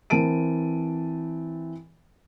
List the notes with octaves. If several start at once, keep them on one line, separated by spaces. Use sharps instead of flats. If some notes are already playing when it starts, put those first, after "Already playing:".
E3 C4 A#4 A5 D7 D#7